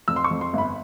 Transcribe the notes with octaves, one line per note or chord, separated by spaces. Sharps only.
F2 E6
C6
C#6
F2
C6
G1 B5